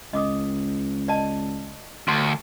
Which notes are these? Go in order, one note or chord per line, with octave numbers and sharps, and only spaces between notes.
C#2 D#5 D6 D#6
D5 D#5 A5
D2 C6